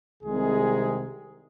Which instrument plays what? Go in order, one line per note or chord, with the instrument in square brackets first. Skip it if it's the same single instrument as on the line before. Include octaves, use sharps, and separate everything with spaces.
[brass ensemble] C2 C3 D#3 G#3 G#4